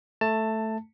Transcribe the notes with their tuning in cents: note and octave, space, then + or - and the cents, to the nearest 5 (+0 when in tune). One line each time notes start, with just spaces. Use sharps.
A3 +0 A5 +15